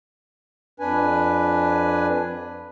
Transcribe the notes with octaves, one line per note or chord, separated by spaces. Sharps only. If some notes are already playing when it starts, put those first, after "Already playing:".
F2 D4 B4 G#5